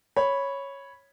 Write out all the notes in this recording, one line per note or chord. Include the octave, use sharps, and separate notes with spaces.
C#5 B5